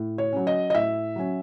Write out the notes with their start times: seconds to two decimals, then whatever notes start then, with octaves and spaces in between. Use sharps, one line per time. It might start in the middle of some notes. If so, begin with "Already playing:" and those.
Already playing: A2
0.18 C#5
0.33 F#3 C#4
0.47 D#5
0.70 D#5
0.75 A2 E5
1.16 F#3 C#4